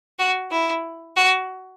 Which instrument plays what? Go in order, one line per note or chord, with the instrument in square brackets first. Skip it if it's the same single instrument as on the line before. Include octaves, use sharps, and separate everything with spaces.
[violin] F#4
E4
F#4